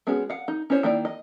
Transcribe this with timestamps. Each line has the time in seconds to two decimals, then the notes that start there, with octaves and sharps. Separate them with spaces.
0.07 G#3 B3 C#4 F#4 G#4
0.30 F5 F#5
0.48 D#4
0.70 C#4 E4 C5 C#5
0.83 D#3 A#3 E4 D5
1.05 D#5